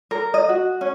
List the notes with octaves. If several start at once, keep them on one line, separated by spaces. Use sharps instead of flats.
A#4
D#5
F#4
C#4